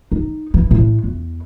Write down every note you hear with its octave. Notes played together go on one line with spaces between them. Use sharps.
D#4
E3
A2
E2